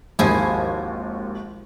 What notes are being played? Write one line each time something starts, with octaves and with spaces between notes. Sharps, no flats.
G#1 D#2 F3 E4 G#4